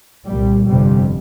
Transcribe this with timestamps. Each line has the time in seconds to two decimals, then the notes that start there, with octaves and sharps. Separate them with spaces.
0.27 C2 A#2 G3
0.67 G1 F2 C3 G3